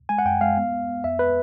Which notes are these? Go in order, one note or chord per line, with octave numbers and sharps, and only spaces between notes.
G#3 G#5
F#5
F#2 G5
G#3 F5
B3
B3
B3
F2 E5
B4